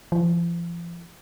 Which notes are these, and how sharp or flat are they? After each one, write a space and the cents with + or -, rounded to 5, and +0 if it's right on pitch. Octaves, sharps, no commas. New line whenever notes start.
F3 -40